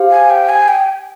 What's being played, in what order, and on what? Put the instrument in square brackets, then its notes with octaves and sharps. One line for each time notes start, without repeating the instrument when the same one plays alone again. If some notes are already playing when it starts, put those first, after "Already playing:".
Already playing: [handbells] G4 C5 F5
[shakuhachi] G#5
G5
G#5
G5